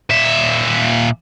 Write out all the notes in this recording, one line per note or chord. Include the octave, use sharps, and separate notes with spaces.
A#2 E5